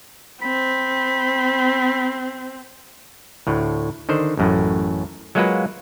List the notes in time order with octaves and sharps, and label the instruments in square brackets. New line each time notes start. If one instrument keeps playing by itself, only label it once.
[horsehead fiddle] C4 [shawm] B5
[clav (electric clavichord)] D2 A2
D3 D#3 C5
A1 F#2 A2
F#3 G#3 A#3 F4 F#4 B4